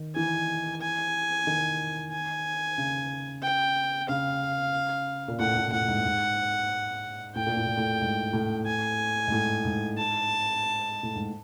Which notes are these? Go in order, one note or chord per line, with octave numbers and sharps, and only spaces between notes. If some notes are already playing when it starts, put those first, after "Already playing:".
Already playing: D#3
E3 G#5
G#5
D#3
G#5
C#3
G5
C#3 F5
A#2
A2 F#5
A2
A2 F#5
G#2
G#2
A2 G5
A#2
A2
A#2
A2
G#2
A2
G#5
G#2
A2
G#2
A5
A2
G#2